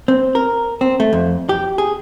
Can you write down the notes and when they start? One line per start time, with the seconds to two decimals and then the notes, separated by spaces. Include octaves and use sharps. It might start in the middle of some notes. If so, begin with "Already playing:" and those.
0.08 C4
0.35 A#4
0.81 C4
1.00 A3
1.13 F2
1.49 G4
1.78 G#4